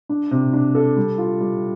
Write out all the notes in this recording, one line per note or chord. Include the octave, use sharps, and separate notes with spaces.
D4
C3
D4
A4
G3
F4
G3